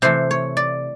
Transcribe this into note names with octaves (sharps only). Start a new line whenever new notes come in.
C3 E3 A3 C5
C#5
D5